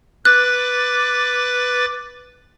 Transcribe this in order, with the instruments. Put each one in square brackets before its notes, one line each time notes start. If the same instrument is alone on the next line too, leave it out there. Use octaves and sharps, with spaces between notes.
[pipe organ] B4 D6 A6 [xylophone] F#6